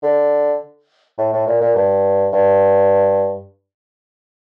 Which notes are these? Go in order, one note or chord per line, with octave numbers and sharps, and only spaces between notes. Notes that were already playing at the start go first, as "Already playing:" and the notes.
D3
A2
A2
A#2
A#2
G2
G2